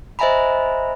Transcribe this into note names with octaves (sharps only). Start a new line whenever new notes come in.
C5 D#5 E5 G#5 A#5 B5